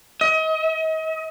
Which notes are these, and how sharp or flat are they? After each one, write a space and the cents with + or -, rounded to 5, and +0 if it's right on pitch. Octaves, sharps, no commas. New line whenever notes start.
D#5 +35